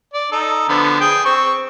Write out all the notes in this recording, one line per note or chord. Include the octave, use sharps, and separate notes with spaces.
D5
D#4 A4
D3 F3 B3
G#4 G5
C4 C#6